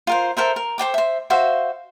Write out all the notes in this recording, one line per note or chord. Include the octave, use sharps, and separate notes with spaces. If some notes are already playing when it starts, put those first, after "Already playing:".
F4 A#4 C5
A4 A#4 C5 E5
A#4
A4 C5 G5 D6
C5 E5
F#4 C5 E5 F5